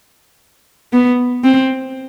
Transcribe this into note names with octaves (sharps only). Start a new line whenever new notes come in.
B3
C4